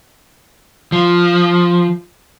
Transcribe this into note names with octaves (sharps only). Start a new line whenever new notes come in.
F3